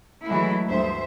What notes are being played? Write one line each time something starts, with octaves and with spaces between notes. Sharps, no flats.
E3 F#3 G#3 A3 E4
D2 G2 C5 E5